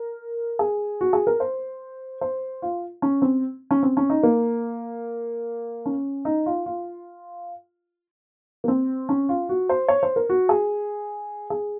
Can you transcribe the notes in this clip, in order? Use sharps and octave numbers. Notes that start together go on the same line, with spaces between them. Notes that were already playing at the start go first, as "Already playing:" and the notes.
Already playing: A#4
G#4
F#4
G#4
A#4
C5
C5
F4
C#4
C4
C#4
C4
C#4
D#4
A#3
C#4
D#4
F4
F4
A#3
C4
C#4
F4
F#4
C5
C#5
C5
A#4
F#4
G#4
G#4